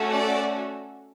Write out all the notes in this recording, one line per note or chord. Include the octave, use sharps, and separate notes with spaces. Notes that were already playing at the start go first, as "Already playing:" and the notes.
Already playing: A3 C#4 F#4 A4
D5